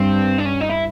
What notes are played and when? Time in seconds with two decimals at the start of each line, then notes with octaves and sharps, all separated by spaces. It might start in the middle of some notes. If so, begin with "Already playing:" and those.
Already playing: G2 C4
0.38 D4
0.46 C#4
0.60 D#4
0.69 E4